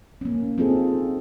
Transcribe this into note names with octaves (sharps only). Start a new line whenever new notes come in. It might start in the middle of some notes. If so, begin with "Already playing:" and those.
A#3 C#4
C4 D#4 F4 G#4 A4